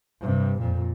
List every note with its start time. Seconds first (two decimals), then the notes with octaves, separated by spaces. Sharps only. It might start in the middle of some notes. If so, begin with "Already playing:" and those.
0.20 G2 C3
0.60 F2 A#2